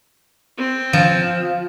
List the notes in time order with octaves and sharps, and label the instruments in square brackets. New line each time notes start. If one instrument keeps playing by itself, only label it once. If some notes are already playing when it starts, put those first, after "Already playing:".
[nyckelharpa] C4
[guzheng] F3